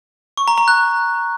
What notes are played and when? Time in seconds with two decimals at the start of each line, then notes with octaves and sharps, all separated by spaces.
0.37 C#6
0.48 A#5
0.58 A#5
0.68 F#6